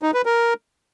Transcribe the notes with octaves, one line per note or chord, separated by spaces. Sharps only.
D#4
B4
A#4